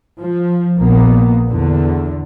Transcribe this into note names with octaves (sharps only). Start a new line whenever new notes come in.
F3
A#1 A#3 B3
E2 D3